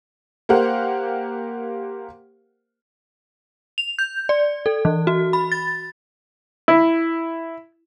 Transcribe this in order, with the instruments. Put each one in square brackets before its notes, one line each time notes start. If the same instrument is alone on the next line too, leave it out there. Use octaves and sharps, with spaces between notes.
[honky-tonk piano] A#3 G4 A#4 C5 F5 F#5
[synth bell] F7
G6
D5
A4
E3
F#4
B5
A6
[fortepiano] E4